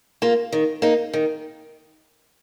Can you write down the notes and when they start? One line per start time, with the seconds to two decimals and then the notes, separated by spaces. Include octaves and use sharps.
0.22 A#3 F4
0.52 D#3
0.82 A#3 D#4
1.13 D#3